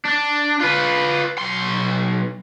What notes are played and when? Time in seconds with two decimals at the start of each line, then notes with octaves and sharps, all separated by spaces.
0.05 D4
0.60 F4 B4
1.39 B1 C6